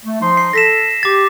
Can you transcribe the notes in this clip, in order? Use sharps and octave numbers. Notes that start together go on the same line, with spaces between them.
A3
F3 D#4 C6
C7
A4 A#6 B6 E7
G4 D6 A6